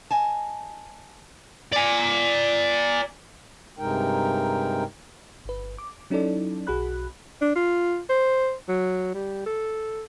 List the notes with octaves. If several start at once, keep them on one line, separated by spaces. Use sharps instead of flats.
D#5 G#5 A5
D5 G#5
G2 C3 G#3 D#4 A#4 G5
G1 B4
D6
F#3 C#4 D#4 E4 A4 D5
B1 F#4 G#4 B5 F#6
D4
F4
C5
F#3
G3
A4